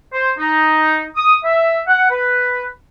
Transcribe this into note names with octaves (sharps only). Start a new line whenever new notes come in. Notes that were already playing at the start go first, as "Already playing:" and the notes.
C5
D#4
D#6
E5
F#5
B4